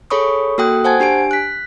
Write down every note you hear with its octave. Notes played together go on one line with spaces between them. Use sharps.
G#4 A4 C#5 B5 C#6 D#6
A#3 F#4 A4 G5 D#6 F#6
C5 F#5 G#5 A5 G#6
D4 G4 G#5 D7
F#6 B6